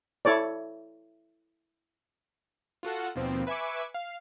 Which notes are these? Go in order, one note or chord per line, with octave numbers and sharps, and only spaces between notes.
E4 A4 C#5 D5
F4 F#4 A4 F#5
D#2 B2 F3 C4
B4 E5 G#5 C#6 D6
F5